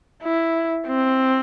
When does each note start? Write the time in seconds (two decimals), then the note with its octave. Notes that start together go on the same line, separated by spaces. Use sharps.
0.23 E4
0.87 C4